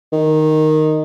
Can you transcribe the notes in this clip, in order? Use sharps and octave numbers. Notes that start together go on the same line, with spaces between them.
D#3